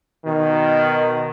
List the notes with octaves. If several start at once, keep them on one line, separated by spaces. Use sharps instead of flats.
B2 D#3